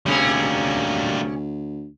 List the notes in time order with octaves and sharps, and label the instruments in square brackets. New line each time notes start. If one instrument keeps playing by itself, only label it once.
[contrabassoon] D2 [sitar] C3 C#4 G#4 [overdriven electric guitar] G3 A#3